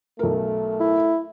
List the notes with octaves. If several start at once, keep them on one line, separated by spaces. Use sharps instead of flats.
B1 A3 A#4
E4